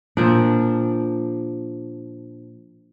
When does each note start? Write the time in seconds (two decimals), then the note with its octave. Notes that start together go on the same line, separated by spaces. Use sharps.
0.17 A#2 F3 D4